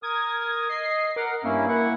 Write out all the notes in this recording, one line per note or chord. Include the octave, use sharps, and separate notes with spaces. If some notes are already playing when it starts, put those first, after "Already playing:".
A#4 D#6 G#6
D#5 C7
A#4 F#5 D6
G2 A#3 C#4 E4
E4 F#5 C#6